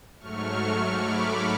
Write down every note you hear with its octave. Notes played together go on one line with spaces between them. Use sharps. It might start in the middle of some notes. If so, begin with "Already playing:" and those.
G#2 F#3 A3 C#6 F6
B5 D6